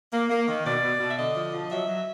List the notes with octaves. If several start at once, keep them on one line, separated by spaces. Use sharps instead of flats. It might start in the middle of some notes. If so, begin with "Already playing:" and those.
A#3
A#3
D#3
B2 D5
B2
B2
E5
D3 D#5
F3
F3
F#3 E5
F#3